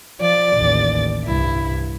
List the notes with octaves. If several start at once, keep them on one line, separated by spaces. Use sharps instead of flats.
F3 D5 A6
A1 D#2
C2 G2 E4